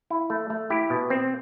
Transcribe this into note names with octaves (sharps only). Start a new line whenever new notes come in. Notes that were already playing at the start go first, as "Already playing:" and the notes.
E4
A3
A3
E4 G4
B2
C4